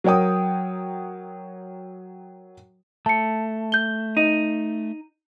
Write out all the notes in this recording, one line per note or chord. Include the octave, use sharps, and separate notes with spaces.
F#3 A#4 C#5 G5 D#6
A3 A5 C#7
G6 G7
D#4